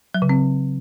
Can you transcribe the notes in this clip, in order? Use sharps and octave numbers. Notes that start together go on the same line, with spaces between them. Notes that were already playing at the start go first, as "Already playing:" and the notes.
F#3
C#3
C4